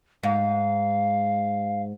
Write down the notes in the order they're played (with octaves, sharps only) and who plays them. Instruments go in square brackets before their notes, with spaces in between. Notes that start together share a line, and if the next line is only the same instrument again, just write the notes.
[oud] G#2 [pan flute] F5